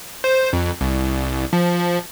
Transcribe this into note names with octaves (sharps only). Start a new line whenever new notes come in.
C5
F2
C2
F3